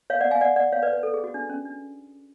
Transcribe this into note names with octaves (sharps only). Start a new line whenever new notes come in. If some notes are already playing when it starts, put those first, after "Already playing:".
C#5 F5
D5 F#5
F5 G#5
D5 F#5
D5 F#5
C#5 F5
B4 D5
B4
A4
G#4
F#4
D4
C#4
D4